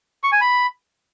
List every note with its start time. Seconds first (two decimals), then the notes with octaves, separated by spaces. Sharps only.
0.24 C#6
0.32 G#5
0.41 B5